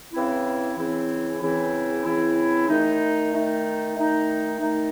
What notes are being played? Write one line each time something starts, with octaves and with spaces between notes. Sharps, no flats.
C#3 E3 C4 E4
C#3 E3 C4 E4
C#3 E3 C4 E4
C#3 E3 C4 E4
D#3 A3 D#4
D#3 A3 D#4
D#3 A3 D#4
D#3 A3 D#4